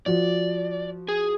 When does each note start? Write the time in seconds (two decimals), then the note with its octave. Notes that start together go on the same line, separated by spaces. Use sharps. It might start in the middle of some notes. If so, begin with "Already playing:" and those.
0.06 F3 F#4 D5
1.08 G#4